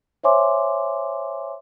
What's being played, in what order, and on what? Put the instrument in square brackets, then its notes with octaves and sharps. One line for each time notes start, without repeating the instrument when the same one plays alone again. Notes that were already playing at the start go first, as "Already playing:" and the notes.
[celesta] C5 C#5 E5 G#5 C6 D6